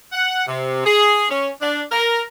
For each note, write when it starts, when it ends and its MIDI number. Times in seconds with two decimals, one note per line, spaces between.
0.13 0.44 78
0.48 0.85 48
0.86 1.27 68
1.30 1.50 61
1.62 1.83 62
1.92 2.22 70